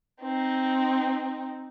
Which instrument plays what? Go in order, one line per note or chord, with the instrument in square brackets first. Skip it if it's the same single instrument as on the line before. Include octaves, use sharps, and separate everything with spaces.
[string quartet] C4 D#4